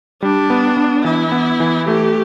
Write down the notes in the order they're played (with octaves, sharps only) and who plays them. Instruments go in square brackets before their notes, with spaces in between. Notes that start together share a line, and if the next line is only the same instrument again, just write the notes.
[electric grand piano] G3 [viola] D4
[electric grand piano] B3
B3
[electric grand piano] E3 [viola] E4
[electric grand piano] B3
E3
[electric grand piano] A3 [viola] G4